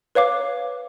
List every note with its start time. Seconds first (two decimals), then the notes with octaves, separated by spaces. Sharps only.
0.15 B4 C#5 F5 D6